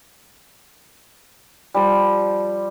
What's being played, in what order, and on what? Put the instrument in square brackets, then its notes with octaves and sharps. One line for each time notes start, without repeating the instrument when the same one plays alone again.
[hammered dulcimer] F3 G3